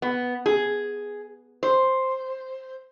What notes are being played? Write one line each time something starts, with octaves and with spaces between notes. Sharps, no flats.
B3
G#4
C5